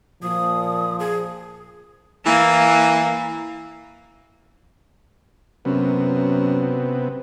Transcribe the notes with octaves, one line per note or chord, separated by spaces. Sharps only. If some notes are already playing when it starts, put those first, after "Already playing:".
A#2 F3 D#6
G#4
E3 A#3
F#2 C3 B3